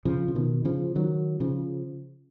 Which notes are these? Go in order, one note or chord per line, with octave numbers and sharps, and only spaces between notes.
C#3 F3
C#3
B2 D#3
C#3 F3
D#3 F#3
C#3 F3